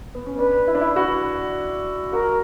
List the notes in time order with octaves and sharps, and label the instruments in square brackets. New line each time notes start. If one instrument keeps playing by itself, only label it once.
[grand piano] B3
C#4
[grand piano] D4 [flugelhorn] B4
[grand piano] E4
D4
E4
F#4
[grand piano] F#4 [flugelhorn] A#4